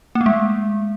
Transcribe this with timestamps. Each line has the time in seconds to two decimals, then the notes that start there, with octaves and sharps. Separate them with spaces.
0.15 A#3
0.21 A3
0.26 G#3